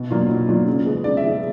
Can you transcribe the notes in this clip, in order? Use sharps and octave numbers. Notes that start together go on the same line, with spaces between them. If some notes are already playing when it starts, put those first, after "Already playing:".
Already playing: B2
F#3 A#3 D4 F4
B2
F#3 A#3 D4 F4
C#3
F3 G#3 B3
C#3 D5
E5
F3 G#3 B3